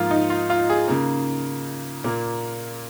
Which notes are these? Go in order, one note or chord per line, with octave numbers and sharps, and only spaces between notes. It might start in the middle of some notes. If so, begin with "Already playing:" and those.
Already playing: G#2 F3 A#3 F4
D#4
F4
F4
G#4
C#3 A#3
A#2 A#3